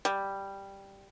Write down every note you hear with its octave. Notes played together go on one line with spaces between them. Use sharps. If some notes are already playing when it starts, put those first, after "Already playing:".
G3